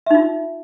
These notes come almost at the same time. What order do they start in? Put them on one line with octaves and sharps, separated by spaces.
E5 D#4 F4